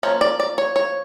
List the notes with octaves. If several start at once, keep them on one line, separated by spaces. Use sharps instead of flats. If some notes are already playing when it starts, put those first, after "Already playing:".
F3 A#3 C#4 C#5
D5
D5
C#5
C#5